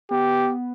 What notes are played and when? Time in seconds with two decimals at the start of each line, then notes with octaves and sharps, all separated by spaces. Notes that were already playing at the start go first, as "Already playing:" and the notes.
0.11 B3 G4